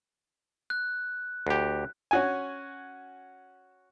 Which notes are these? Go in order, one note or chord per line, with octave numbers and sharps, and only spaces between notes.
F#6
D2 G4
C#4 F#4 G#5